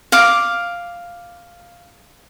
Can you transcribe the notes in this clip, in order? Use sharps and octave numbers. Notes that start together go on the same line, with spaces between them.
F5 D6